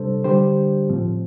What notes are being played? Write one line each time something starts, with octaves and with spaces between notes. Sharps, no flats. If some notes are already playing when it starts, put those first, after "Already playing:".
Already playing: C3 G3 D4 A4 C5
D3 G3 D4 G4 C5
A2 F3 C4